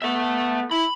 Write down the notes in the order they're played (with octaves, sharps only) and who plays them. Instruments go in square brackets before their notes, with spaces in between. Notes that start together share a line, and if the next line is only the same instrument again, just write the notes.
[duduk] B3 [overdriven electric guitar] A4 E5
[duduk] E4 [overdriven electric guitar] B5